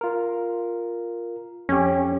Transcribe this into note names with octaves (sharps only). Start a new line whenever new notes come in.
F4 A#4
F2 C#4 G4